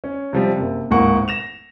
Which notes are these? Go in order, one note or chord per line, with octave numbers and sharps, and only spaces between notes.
C#4
C3 F3 G3
F#1 C3
D1 G#2 A#3 F#5 C#6
A#6 E7 F7